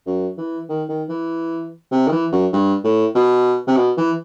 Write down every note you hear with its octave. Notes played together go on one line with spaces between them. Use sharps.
F#2
E3
D#3
D#3
E3
C3
D#3
E3
F#2
G2
A2
B2
C3
B2
E3